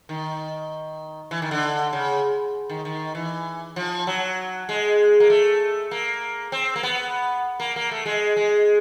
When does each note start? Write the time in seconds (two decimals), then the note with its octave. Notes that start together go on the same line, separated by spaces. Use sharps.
0.09 D#3
1.31 E3
1.42 D#3
1.51 D3
1.93 C#3
2.70 D#3
2.85 D#3
3.15 E3
3.76 F3
4.07 F#3
4.69 G#3
5.20 A#3
5.30 A3
5.91 A#3
6.52 C4
6.76 A#3
6.83 B3
7.60 A#3
7.76 A#3
7.91 A3
8.06 G#3
8.37 G#3